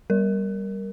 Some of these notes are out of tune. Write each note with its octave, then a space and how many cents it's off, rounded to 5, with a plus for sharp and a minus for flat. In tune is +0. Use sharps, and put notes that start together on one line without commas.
G3 +0 A#4 +0